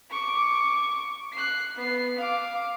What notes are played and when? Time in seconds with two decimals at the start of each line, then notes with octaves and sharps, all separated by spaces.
0.10 C#6 D6
1.33 F#6 C7
1.76 B3 C7
2.18 F5 D6